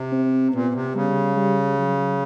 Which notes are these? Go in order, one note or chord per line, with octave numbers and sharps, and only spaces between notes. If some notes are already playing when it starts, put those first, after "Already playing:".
Already playing: C3
C4
A#2 B3
C3
C#3 G3
G3
F#3